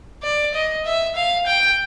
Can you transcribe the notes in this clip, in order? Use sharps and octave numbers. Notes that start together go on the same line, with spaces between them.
D5
D#5
E5
F5
G5